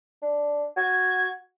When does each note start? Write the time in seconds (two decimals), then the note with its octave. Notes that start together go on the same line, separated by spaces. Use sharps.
0.22 D4
0.77 F#4 G#6